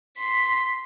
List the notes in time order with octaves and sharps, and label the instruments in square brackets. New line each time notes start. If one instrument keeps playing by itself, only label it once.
[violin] C6 B6